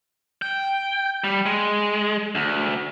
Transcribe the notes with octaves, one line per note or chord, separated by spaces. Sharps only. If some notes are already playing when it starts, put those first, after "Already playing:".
G5
G3
G#3
D2